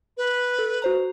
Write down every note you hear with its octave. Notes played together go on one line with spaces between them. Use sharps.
B4
A4
F#4 C5 A#5